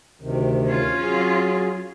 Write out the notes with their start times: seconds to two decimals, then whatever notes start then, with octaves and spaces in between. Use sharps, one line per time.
0.22 D2 C3 D#3
0.66 C#4 F4
1.02 F#3 G#4